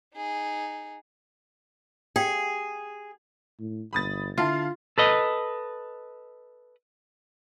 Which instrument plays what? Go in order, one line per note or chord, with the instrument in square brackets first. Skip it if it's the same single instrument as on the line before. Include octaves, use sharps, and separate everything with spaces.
[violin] D#4 G#4
[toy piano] G4 F5 G5 [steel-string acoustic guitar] G#4
[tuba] A2
[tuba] G1 [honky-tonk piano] B5 D#6 A6
[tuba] D3 [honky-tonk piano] E4 F5 A5 [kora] F4
[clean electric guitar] A4 B4 D#5